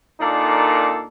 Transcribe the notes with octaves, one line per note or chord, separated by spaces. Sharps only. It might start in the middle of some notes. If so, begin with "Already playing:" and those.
A#2 A#3 D4 D#4 A4